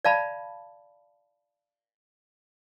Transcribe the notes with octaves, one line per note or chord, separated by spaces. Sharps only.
D5 F5 A5 B5